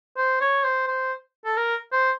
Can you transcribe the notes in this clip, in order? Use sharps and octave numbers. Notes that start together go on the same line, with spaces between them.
C5
C#5
C5
C5
A4
A#4
C5